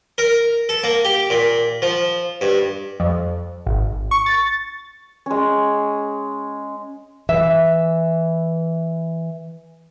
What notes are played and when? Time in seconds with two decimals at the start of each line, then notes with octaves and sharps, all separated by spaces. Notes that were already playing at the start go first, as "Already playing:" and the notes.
0.18 A#4
0.69 A4
0.84 A#3
1.05 G4
1.30 A#2
1.82 F3
2.41 G2
3.00 F2
3.67 G#1
4.11 C#6
4.26 A6
5.26 G#3 C#4
7.29 E3 E5